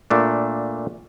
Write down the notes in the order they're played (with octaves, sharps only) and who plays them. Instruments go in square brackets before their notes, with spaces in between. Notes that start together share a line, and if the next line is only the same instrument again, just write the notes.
[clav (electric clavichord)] A#2 A3 D4